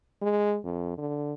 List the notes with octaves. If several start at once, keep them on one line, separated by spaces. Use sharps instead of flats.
G#3
F2
D3